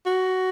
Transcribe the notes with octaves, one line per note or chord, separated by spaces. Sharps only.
F#4